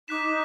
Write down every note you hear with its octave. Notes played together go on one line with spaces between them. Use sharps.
D#4 D6 F#6 B6 E7